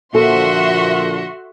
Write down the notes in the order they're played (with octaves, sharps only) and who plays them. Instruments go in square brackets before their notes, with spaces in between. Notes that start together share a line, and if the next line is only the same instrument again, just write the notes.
[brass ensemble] A#2 D3 F3 [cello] F#4 [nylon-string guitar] A4 [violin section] E5 F#5 C6